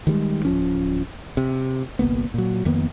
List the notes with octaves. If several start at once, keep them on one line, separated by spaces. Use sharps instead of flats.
D#3 F3 G3 G#3
D1 F3 C#4
C3
G1 C2 A#3 B3
A#2 F#3
F2 D#3 A#3 B3